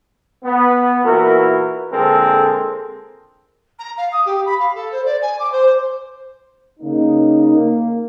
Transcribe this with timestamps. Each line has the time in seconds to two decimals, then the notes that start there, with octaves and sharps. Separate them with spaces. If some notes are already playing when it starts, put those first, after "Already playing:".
0.43 B3
1.04 A#2 E3 E4 F#4 A#4
1.91 A#2 D3 G#3 C4 A4 A#4
3.79 A#5
3.98 F5
4.12 D#6
4.26 G4
4.46 B5
4.59 F5
4.75 A4
4.92 C5
5.05 D5
5.22 G#5
5.39 D6
5.52 C5
6.80 C#3 A#3 D#4
7.54 A#3